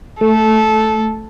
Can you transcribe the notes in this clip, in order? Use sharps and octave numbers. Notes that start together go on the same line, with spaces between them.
A3 A4